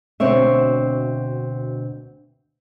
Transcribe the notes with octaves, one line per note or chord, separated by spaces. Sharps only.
D2 B2 C4 C#5 E5